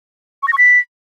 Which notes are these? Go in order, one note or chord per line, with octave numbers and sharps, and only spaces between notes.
C#6
A#6
C#6
B6